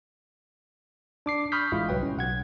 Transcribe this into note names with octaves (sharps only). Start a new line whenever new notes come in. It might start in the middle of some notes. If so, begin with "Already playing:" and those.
D4 D6 C7
B5 C#6 D#6 F6 G6 B6
A1 G#3 E4 F4
C2 F#3 B4 G5
C#4
B1 F#5 G#6